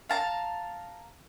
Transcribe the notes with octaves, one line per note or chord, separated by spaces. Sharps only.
F5 A5 A#5